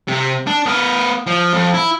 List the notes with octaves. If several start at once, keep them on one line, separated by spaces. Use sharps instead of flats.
C3
D4
B3 A#4
F3
F2
E4